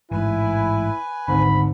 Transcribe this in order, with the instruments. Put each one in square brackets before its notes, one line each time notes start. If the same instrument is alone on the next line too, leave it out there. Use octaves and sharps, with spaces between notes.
[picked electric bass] A1 G#2 [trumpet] E4 [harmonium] B4 G#5
[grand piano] G#1 D2 G#2 [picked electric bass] D3 [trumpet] B5